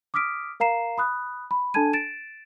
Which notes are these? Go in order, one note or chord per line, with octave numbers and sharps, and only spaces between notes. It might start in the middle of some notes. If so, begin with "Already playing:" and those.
D6 D#6 F6 B6 D7
A#4 F5 A#5 C7 E7
B5 D#6 F#6
B5
D4 A4 G#5 A5 G#6 D#7
A6 D7 E7